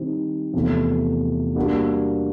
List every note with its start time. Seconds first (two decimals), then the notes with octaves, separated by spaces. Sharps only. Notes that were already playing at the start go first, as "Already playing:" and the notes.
Already playing: D#3 G3 C4 D#4
0.53 E2 C3 F3 A3
1.56 G3 A#3 D4 F#4